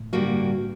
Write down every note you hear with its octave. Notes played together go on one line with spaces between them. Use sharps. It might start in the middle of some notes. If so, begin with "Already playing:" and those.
Already playing: A2
G2 D3 G3 A#3 F#4